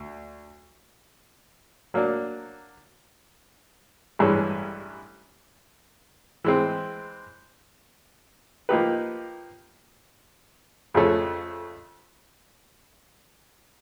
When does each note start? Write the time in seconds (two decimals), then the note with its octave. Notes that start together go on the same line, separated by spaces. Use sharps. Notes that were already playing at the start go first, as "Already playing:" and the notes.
Already playing: D2
1.94 F#3 A#3 D4
4.19 A1 G2 E3 G#3 C#4
6.44 E3 G#3 C4
8.69 F3 A#3 D#4 G4 B4
10.94 F2 C#3 F3 A3 C#4